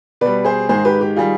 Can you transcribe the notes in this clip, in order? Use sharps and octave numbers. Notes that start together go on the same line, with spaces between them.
B2 G3 B4 D5
G#4 C5
G#2 D#3 G#3 G#4 C5
G4 B4
G4
D#3 G3 F4 G#4